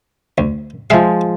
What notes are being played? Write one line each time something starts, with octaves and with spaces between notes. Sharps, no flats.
D2
F3 G#3 E5 F5